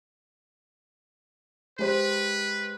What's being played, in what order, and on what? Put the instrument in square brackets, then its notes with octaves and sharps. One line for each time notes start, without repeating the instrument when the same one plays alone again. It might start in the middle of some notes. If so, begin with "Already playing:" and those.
[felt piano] G#3 G4 C5 [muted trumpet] B4